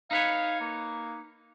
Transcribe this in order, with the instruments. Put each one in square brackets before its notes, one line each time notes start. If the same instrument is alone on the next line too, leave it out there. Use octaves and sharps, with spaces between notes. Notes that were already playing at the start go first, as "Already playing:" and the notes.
[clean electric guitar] D#4 B4 C#5 [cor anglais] F5
[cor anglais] A#3